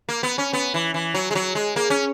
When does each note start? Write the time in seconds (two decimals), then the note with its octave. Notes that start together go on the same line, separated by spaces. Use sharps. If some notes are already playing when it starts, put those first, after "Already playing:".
0.09 A#3
0.23 B3
0.38 C#4
0.53 B3
0.74 E3
0.94 E3
1.14 F#3
1.31 G#3
1.35 F#3
1.55 G#3
1.76 A#3
1.90 C#4